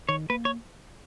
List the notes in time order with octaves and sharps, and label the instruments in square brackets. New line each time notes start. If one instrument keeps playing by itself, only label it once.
[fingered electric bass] D#3 [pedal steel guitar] C#5
[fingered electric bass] A#3 [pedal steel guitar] B4
[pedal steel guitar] C#5